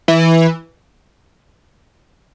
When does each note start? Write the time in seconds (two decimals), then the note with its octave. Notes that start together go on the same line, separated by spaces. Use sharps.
0.08 E3